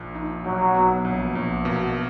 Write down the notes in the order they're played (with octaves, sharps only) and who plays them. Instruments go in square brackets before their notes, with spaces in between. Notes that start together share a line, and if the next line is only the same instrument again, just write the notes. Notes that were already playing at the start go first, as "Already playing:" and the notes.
Already playing: [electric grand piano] A#1 A#2
D#4
[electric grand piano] B1 [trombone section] F#3
[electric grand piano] B3
A#1
A#1
[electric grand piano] B2 [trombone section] A#3